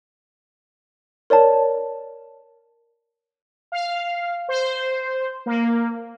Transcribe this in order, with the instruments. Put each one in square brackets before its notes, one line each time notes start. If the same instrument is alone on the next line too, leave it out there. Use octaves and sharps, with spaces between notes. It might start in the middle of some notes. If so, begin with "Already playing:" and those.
[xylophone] A#4 C#5 D5 A5
[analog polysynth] F5
C5
A#3